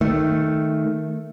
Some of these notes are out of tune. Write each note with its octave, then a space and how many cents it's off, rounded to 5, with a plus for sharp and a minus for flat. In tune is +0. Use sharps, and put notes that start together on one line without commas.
D#3 +0 A3 +0